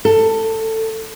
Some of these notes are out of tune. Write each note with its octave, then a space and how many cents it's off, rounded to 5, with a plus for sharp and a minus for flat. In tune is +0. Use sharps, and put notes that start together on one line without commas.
A4 +20